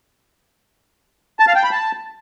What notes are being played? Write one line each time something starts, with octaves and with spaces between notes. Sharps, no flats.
A5
F5
G5
B5
A5